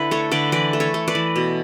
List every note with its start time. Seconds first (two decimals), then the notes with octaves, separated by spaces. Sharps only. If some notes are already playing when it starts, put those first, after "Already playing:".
Already playing: D3 E4 B4
0.11 A3 A4 C#5
0.31 D3 B4 D5
0.52 E3 B4 D5
0.73 A3
0.80 A4 C#5
0.94 A3
1.08 B4 D5
1.15 E3
1.36 B2